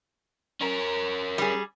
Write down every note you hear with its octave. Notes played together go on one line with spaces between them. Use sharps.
C#4 A#4
G3 G#4